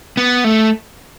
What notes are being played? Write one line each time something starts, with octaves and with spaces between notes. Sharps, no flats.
B3
A3